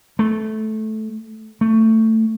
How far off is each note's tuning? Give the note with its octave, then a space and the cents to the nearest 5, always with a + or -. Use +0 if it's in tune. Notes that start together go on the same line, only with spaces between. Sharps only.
A3 -15
A3 +15